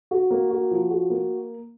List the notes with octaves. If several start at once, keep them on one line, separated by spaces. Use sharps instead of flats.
F#4
A#3
F#4
F3
F#4
A#3